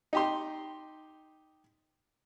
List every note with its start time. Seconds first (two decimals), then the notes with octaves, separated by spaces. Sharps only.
0.13 D#4 G4 C6